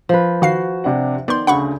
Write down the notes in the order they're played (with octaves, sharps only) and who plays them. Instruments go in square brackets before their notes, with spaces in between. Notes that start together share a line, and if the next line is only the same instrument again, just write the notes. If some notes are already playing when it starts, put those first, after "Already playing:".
[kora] F3 B4
[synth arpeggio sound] D#3 F5 C7 [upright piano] F#4
[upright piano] C3 D4 F#5
[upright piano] D#3 G6 [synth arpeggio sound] B3 C6 [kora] D5
[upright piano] D2 C#3 [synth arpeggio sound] F#5 B5 C#6